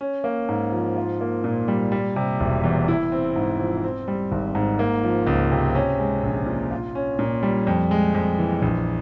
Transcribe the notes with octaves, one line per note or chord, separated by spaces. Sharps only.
C#4
A#3
G#2
F3
F4
A#3
A#2
G3
G3
C3
E1
E2
E4
C4
G#2
F3
C4
G3
G#1
G#2
A#3
F3
C#2
C3
C#4
G#3
A#1
A#2
F4
C#4
A#2
G3
F2
G#3
F2
E3
A#1